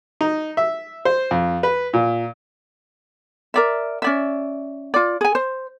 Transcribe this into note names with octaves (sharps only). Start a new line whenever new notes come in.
D#4
E5
C5
F2
B4
A#2
A#4 D5 E5
C#4 D5 E5
F4 D5
G#4 G#5
C5